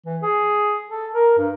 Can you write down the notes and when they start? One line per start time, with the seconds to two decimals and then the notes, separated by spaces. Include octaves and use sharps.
0.06 E3
0.23 G#4
0.91 A4
1.14 A#4
1.38 G2